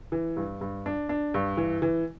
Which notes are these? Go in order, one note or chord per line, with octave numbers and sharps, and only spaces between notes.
E3
G2
G2
D4
D4
G2
E3
E3